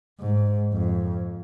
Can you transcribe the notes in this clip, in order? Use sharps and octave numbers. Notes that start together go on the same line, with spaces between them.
G#2
F2